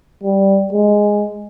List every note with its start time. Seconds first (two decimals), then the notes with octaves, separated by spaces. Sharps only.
0.23 G3
0.72 G#3